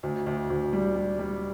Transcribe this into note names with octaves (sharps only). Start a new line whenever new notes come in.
D2
D2
D2
G3
G3
G3